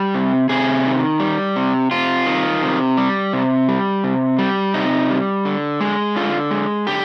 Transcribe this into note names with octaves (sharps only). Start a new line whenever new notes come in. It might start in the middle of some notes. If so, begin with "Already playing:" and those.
Already playing: G3
C3
C3 G#4
D#3
G3
C3
C3 F4
D#3
C3
G3
C3
G3
C3
G3
C3 D#4
G3
D3
G#3
D3 F4
G#3
D3 G4